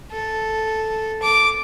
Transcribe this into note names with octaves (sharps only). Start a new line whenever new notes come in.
A4
D6